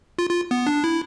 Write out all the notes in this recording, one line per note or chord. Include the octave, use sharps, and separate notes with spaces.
F4
F4
B3
D4
E4